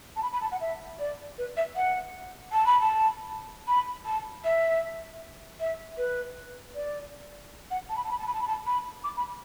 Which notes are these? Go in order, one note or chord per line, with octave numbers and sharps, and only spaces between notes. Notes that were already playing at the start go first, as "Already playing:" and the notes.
A5
B5
B5
A5
F#5
E5
D5
B4
E5
F#5
A5
B5
A5
B5
A5
E5
E5
B4
D5
F#5
A5
B5
A5
B5
A5
B5
A5
B5
A5
B5
D6
B5